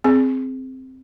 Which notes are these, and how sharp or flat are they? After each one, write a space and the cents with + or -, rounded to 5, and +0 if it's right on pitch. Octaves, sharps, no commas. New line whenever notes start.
C4 +0 G#4 +10